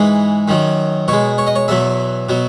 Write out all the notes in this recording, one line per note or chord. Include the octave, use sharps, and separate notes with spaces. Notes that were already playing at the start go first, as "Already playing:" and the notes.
Already playing: G#2 E3 G#3 B4
F#2 D#3 F#3
B2 G#3 C#5
C#5
D#5
C#5
E2 B2 F#3 E5
B2 F#3